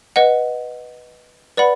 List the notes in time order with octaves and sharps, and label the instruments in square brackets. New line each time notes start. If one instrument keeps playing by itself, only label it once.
[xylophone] B4 D#5 F#5
B4 D5 F#5 B5